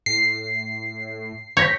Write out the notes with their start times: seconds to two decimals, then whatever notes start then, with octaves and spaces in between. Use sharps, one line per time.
0.06 A2 C7
1.57 C#5 G6 A#6 B6